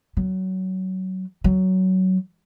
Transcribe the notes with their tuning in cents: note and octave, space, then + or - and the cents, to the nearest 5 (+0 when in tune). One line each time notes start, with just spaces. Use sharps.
F#3 +20
F#3 +15